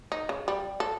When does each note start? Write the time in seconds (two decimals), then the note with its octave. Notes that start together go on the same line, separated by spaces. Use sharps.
0.12 D#4
0.29 C#3
0.48 G3
0.80 A4